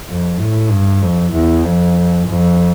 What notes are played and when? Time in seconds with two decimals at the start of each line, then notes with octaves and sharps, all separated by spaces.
0.08 F2
0.39 A2
0.71 G2
1.01 F2
1.33 E2
1.64 F2
2.27 F2